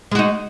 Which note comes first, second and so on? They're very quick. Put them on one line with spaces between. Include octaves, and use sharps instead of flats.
G#3 F#4 D#4